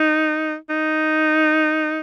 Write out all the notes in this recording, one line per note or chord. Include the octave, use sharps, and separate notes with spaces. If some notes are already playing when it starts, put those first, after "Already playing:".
Already playing: D#4
D#4